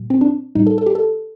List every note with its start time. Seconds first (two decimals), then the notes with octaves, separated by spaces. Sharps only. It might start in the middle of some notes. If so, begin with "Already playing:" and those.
Already playing: A#2 F#3
0.10 C4
0.21 D4
0.55 A2 G3 D#4
0.67 A4
0.78 A4
0.86 G4
0.95 A4